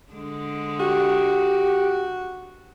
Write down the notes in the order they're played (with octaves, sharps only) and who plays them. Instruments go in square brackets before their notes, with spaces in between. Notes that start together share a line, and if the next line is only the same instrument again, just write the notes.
[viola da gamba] D3 G#3 D4
[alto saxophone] F#4 [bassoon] G4